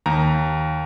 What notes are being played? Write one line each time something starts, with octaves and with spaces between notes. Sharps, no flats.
D#2 A#5